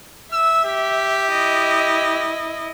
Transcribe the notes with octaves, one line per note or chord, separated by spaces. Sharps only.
E5 E6
G4
E4 D#5